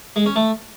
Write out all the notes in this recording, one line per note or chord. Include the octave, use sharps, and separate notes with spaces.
G#3
C#4
A3